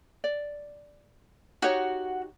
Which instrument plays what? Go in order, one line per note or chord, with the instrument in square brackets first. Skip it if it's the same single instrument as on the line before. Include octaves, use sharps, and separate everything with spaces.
[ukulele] D5
[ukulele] D#4 G4 C#5 [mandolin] F#4